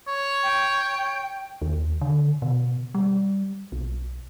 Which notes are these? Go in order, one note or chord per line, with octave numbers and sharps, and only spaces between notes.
C#5
G5
D#2
D3
B2
G3
B1